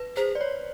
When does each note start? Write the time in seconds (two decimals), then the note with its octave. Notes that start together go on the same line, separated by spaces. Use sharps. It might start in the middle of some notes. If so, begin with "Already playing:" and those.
Already playing: B4
0.16 G#4 C5
0.35 D5
0.41 C#5